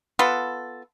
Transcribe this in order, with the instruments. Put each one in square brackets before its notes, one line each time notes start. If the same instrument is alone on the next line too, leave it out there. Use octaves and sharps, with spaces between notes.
[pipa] B3 F4 A4